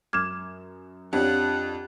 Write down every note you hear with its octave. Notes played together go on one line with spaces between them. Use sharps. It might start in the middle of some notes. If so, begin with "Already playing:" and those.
F#2 D6 F6 G#6 E7
F2 D4 F4 G4 C#5 F#5